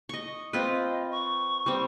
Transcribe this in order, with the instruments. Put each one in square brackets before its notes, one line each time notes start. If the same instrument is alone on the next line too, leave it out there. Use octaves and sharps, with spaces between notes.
[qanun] D#5 C#6
[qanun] C4 F4 B4 [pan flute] D#5
[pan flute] C#6
[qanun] G3 C4